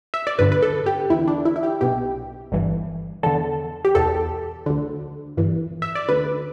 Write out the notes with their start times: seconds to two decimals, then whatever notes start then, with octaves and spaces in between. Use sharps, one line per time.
0.14 E5
0.27 D5
0.39 G1 G2 D3 B4
0.52 B4
0.62 A4
0.86 G4
1.10 E2 D3 E4
1.28 D4
1.45 E4
1.56 E4
1.63 G4
1.81 B1 B2 G4
2.52 G1 G2 E3
3.23 E2 D3 A4
3.85 G4
3.95 E2 B2 A4
4.66 D2 D3
5.37 G1 G2 E3
5.82 E5
5.95 D5
6.08 D2 D3 B4